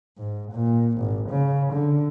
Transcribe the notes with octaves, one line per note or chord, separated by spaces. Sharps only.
G#2
A#2
G#1
C#3
D3